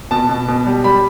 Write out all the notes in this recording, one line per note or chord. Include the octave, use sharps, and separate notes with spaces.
B2 A5
B2
B2
G3
G3 B5